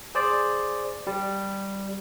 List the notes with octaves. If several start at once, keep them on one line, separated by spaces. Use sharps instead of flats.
G#4 C5 D5
G3